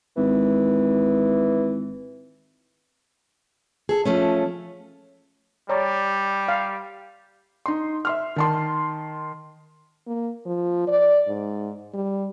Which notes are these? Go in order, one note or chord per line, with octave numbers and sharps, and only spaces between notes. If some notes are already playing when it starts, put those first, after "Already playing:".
G#1 E3
G#4 A4
F3 A3 C#4
G3 C#5 D5 A#5
F5
D#4 C6
E5 C6 F6
D#3 A5 C6
A#3
F3
D5
G#2
G3